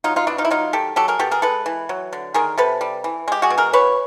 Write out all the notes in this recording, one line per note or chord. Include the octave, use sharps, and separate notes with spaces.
F#3 D#4 F4
D#4 F4
B2 D4 E4
D#4 F4
E4
F#3 D#4 F4
D#3 G4 A4
F#3 G4 A4
G#4 A#4
B2 G4 A4
G#4 A#4
G#3 A4 B4
E3
F#3
D3
D#3 G#4 A#4
C3 A4 B4
G3
E3
G#3 G4
F#4 G#4
B2
G#4 A#4
E3 B4 C#5